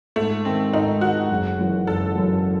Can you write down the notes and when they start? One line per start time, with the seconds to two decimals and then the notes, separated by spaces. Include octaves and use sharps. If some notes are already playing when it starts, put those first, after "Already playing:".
0.16 G#2 A3
0.45 D#3 G#3 C4
0.73 G#2 D#4
1.01 D#3 G#3 F#4
1.30 F#1
1.59 F#2 E3
1.87 F#1 A4
2.16 F#2 E3